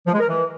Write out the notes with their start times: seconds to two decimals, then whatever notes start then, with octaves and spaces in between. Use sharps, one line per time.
0.07 F3
0.13 G#3
0.20 A#4
0.27 E3